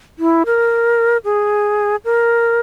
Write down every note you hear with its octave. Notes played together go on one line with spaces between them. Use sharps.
E4
A#4
G#4
A#4